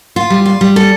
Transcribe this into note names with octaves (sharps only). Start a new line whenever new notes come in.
F4
G3
F4
G3
A4